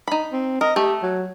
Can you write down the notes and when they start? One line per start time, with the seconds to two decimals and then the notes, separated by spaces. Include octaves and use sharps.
0.08 D#4 B5
0.32 C4
0.61 A#4 D#5
0.76 A3 G4
1.02 F#3